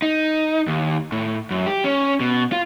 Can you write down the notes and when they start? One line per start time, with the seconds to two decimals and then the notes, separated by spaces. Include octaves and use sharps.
0.02 D#4
0.67 D#2
1.12 A2
1.50 F#2
1.67 G4
1.84 C#4
2.20 B2
2.52 F4